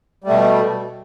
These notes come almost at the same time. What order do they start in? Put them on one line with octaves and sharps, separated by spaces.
G3 A3 B2